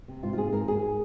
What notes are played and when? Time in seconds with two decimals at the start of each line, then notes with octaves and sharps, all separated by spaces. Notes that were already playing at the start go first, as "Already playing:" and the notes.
0.08 C3
0.23 G#2 F4
0.33 F4
0.38 C4 G#4
0.52 G#2 A#4
0.67 G#2 G#4